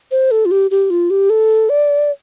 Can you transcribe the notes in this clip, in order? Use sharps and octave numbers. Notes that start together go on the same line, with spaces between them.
C5
A4
F4
G4
G4
F4
G4
A4
D5